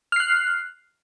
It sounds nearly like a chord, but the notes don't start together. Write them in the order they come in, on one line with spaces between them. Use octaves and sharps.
F6 C7 F#6